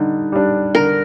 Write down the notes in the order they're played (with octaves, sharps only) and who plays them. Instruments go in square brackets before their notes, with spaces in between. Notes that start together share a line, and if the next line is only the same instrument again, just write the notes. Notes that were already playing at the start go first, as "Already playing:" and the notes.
Already playing: [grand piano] D3 G3 [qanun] D#4
[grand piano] G3 D4
[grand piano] D3 [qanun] A#4